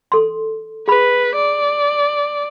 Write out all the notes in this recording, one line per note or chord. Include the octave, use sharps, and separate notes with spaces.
A4 C6
G#4 B4 B5
D5